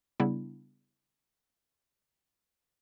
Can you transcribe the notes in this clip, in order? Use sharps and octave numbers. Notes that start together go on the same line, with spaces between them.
C#3 G3 B3 D4 E4